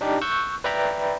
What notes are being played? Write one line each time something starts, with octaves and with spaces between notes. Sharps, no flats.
D4 D#4 G4
C#6 E6 F#6 G6
B4 D5 E5 G5 A#5 B5